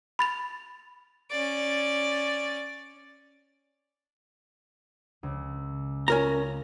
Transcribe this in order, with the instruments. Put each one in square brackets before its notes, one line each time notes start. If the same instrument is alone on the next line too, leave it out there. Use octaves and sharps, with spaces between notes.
[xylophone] B5 A6 F7
[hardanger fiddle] C#4 D5
[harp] C#2
[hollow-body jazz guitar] C#4 A#4 A#5 [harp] F4